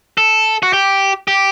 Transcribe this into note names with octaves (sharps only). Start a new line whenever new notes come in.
A4
F#4
G4
G4